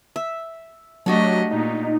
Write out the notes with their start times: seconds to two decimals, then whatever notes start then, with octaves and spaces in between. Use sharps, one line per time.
0.16 E5
1.06 F#3 A3 D4 F#4 G4 D#5
1.51 A#2 D#4